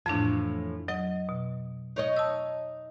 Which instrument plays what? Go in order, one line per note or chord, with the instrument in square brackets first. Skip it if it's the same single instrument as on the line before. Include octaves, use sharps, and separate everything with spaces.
[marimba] F2 D4 [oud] A2 E3 F3
[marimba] F#3 [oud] D#5
[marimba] B2
[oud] D#4 C#5 D#5
[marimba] A5 D#6 E6